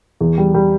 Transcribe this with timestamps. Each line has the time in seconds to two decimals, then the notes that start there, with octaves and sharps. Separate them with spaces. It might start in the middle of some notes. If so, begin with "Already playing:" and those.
0.20 E2
0.38 G3
0.54 G3